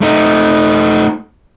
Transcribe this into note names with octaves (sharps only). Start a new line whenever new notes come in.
A3 D#4